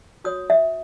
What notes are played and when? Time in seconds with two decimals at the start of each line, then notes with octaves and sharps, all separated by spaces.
0.24 F#4 C#5 D#6
0.50 E5